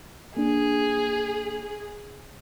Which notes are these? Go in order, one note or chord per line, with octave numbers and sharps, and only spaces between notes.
A#3 D4 G#4